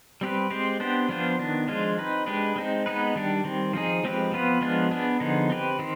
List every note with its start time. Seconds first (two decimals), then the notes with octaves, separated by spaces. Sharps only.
0.21 G3 C4 G4 B4
0.51 G#3 C4 G4 C5
0.80 B3 D4 G4 C5
1.09 F3 B3 D4 F4 C5
1.39 D#3 B3 D4
1.68 F3 G#3 D4 F4 G#4
1.98 C4 D#4 B4
2.26 G#3 D4 G4 B4
2.56 G#3 C4 D#4
2.86 G#3 B3 D#4 B4
3.16 D#3 G3 D4 G4
3.44 D#3 G3 C4
3.73 F3 C4 D#4 G#4
4.04 F3 G#3 C4 G4 B4
4.32 F3 B3 F4 B4
4.61 F3 G#3 B3 D4 F4
4.91 B3 D4 G#4
5.20 D3 F3 B3 D#4 G#4
5.50 C4 G4 B4
5.79 D#3 C4